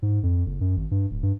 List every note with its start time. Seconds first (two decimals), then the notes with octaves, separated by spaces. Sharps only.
0.02 G#2
0.23 F2
0.46 F#1
0.61 F#2
0.77 G#1
0.91 G2
1.11 D1
1.23 G2